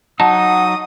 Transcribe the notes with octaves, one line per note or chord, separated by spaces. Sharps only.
F#3 D#4 F#5 A5 D#6